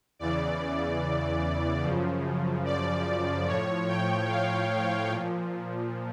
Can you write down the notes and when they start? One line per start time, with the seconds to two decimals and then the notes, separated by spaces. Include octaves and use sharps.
0.19 E2 C#3 E3 D5
1.83 F#2 C#3 F3
2.65 D5
3.47 A2 F3 C#5
3.88 G5
4.29 F5
5.11 A#2 F3